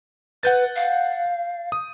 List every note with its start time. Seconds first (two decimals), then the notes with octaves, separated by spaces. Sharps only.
0.43 B4 F#5 G6 A6
0.76 F5
1.72 D#6